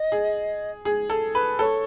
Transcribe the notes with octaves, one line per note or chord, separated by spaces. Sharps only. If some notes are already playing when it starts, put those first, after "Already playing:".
Already playing: D#5
G#4
G#4
A4
B4
A4 C#5